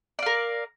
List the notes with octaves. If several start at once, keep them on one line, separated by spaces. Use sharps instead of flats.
A#4 D5 F5